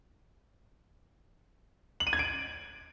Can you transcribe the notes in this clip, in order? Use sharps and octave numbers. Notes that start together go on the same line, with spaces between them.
F#7
D#7
G#6
D7